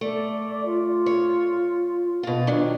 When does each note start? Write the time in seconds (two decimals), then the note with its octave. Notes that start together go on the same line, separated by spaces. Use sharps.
0.01 A3 D5
0.65 F4
1.06 C#5
2.23 B2 F4
2.47 D#3 F#3 D4